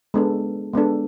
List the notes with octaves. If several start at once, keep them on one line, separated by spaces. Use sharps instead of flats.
G#3 B3 D4 A4
G#3 B3 D4 A4